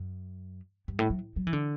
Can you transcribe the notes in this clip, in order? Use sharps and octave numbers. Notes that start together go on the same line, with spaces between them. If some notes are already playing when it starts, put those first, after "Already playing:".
Already playing: F#2
G2
A2
F#3
F#3
E3
D3